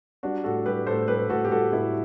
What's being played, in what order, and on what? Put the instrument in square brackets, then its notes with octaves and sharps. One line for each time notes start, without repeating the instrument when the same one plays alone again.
[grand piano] G3 D4 F#4
A2 F#4 A4
G3 G4 B4
A2 A4 C5
G3 G4 B4
A2 F#4 A4
G4
G3 F#4 A4
A2 E4 G4